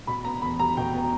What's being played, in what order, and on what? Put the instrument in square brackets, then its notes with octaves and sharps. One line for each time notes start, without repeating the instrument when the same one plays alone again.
[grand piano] B2 [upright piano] B5
[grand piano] B3 [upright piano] A#5
[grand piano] E2 [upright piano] B5
[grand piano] G3 [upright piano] A#5
[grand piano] B2 [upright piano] G5
[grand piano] B3